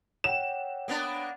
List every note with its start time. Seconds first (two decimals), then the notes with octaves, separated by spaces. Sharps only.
0.24 C#5 F#5 G5 E7
0.88 A#3 B3 D4